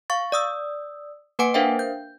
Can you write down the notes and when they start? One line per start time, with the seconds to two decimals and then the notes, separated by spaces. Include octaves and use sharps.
0.10 F5 C#6 A6
0.32 D5 D#6 E6
1.39 A#3 B4 F#5 G#5 D6 D7
1.54 D4 A#4 C5 E5 F5 G5
1.79 G6